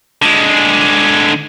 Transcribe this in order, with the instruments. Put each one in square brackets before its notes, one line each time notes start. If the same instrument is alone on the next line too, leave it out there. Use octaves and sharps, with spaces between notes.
[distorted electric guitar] D3 G#3